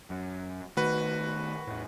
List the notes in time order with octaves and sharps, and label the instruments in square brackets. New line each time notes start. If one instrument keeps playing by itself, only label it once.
[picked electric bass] F#2
[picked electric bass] D#3 A3 [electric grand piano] F#4 B4
[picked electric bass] E2 A2